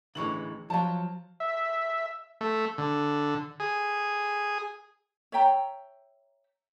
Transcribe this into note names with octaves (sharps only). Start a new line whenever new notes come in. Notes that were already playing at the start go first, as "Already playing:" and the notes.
A1 D3 E3 G#3 C#6 F#7
F3 F#3 F5 A5
E5
A3
D3
G#4
C#5 E5 G5 A#5